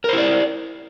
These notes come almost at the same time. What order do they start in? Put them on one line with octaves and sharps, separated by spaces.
A#4 C5 E4 D5